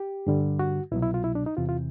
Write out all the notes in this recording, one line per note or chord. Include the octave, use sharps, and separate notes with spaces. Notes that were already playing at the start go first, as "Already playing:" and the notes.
Already playing: G4
G2 D3 G3
F#4
C2 B2 F#3 E4
E4
F4
E4
D4
D#4
E2 C3 E3 F4
F4